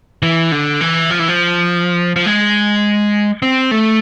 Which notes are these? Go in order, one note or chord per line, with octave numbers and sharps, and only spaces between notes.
E3
D3
E3
F3
E3
F3
F3
G#3
C4
A3